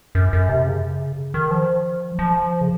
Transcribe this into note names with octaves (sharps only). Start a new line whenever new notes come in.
F#2
F#2
C3
C#3
D#3
F3
F3
C#3